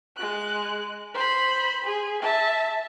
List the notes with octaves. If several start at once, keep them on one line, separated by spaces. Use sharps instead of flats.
G#3 F#6
C5 B5
G#4
E5 A5